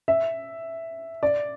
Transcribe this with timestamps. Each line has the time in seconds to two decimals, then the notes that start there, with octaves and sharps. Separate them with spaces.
0.08 E5
1.23 D5